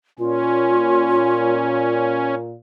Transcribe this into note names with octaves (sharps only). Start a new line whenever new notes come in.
A#2 C#4 F4